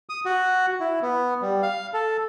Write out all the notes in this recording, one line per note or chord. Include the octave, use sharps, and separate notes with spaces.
D#6
F#4
E4
B3
G3
F5
A4